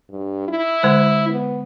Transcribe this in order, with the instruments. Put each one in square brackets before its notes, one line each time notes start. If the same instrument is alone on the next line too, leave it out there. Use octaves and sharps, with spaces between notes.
[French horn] G2
E4
[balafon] D3 G#3 C5
[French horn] B3